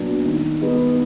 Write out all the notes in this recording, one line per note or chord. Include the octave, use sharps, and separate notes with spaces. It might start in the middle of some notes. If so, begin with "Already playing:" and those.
Already playing: A#2 F#3 B3 D4
D#3
G#3 B3 D#4